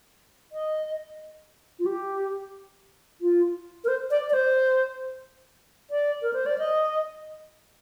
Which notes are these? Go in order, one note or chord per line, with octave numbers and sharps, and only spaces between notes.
D#5
F4
G4
F4
A#4
C5
D5
D5
C5
D5
A#4
C5
D5
D#5